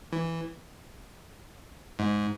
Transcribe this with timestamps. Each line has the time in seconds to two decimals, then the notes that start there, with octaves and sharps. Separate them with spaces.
0.12 E3
1.99 G#2